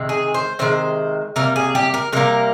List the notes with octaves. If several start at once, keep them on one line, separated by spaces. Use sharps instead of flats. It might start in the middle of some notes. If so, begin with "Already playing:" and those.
Already playing: C3 D#3 G#3
G#4
C5
C3 D#3 G#3 C5
C3 G3 A#3 A#4
G#4
G4
A#4
C3 G3 A#3 A#4